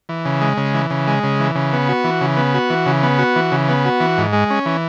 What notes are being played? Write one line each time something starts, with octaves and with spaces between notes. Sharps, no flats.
E3
C#3
G#3
C#3
E3
C#3
G#3
C#3
E3
C#3
B3
F#4
E3
C#3
B3
F#4
E3
C#3
B3
F#4
E3
C#3
B3
F#4
E3
G#2
G#3
C#4
E3